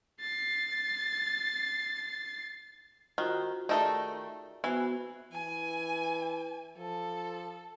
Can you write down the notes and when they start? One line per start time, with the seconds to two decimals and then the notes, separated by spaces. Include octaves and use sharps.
0.20 A6 C7
3.18 D#3 F4 F#4 C5
3.69 D#3 A3 D#4 G#4 D5 E5
4.64 E3 B3 F#4 C5
5.32 E3 G#5
6.77 F3 A4